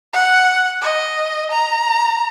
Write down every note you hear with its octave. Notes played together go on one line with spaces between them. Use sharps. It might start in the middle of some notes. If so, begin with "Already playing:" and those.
F#5
D#5
A#5